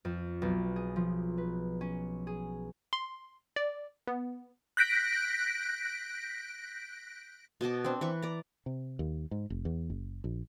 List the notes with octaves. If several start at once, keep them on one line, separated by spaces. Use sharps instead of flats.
F2
B1
G#4
F3
B4
C#4
G#4
C6
D5
B3
F#6 G6 A#6 B6 D7
B2 D#5 A5 D6
C4 D4
E3 B4 C#6
D5 A#5
C3
D#2
G#2
F1
E2
F#1
A#1